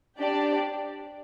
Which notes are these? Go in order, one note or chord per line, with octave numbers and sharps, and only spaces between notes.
D4 G4 D5